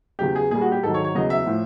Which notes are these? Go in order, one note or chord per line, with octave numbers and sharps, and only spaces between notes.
E2 C#3 F#3 G4
G#4
A#2 G3 G#4
F#4
G4
G#2 D#3 F#3 A4
C#5
C#5
E2 C#3 F#3 D#5
E5
A2 F3